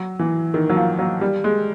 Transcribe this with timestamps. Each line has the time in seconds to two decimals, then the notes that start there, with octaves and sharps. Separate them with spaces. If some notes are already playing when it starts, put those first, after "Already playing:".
Already playing: F#3
0.19 E3
0.54 D#3
0.70 F#3
0.76 F3
0.99 F#3
1.21 G3
1.44 G#3